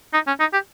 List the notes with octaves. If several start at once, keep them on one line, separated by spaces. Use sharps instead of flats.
D#4
C#4
D#4
G4